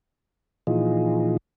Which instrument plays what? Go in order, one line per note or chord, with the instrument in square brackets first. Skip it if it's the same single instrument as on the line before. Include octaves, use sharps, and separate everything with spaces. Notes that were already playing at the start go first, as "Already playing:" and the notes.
[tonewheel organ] A#2 E3 F3 D#4 F4 G#4